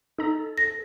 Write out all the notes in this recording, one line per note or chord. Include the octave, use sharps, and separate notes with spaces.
D#4 A4 A#5
A#6